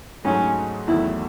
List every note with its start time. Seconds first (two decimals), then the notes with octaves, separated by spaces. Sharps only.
0.25 G#2 F#3 A3 C#4 D#4 G#4
0.88 E2 D#3 F#3 A3 E4